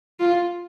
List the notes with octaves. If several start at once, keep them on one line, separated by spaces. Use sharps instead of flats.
F4